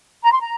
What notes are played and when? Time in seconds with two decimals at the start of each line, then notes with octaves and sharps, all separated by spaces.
0.23 A#5
0.31 C6
0.40 A#5